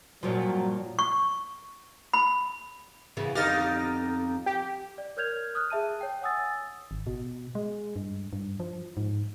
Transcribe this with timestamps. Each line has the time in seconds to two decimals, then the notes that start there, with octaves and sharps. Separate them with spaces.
0.23 G2 A#2 F3 F#3
0.99 C#6
2.14 B5
3.17 C#3 E3 B3
3.35 F2 D3 B3 D#4 G4 F6 A6 A#6
4.46 G4
4.98 D5
5.17 A#4 C#5 F6 G6 G#6 F7
5.55 D#6 F6 F#6
5.70 G#4 E5 A5 D#7
6.01 C#5 G5
6.21 C#5 F#5 G#5 D#6 E6 A6
6.91 G#1
7.07 B2
7.55 G#3
7.96 G2
8.33 G2
8.60 F3
8.97 G#2